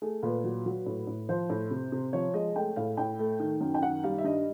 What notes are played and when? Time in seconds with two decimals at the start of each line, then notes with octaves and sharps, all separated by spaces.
0.02 A3 G#4
0.23 A#2 B4
0.44 F#3
0.66 F#3
0.86 A2
1.07 A2
1.29 F3 C5
1.50 A2
1.71 C3
1.92 C3
2.13 F3 C#5
2.34 G#3 D#5
2.56 A3 G5
2.76 A2 F5
2.97 A2 G5
3.19 A3
3.40 D#3
3.61 F#2
3.74 G5
3.82 D#3 F#5
4.04 G3 F5
4.18 E5
4.24 G2 D#5